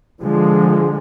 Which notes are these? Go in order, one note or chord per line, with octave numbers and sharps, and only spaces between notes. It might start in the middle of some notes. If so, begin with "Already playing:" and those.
D3 F3 G#3